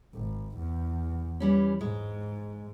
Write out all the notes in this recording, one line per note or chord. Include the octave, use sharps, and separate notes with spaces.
G#1
E2
E3 G3 C#4
G#2 G#3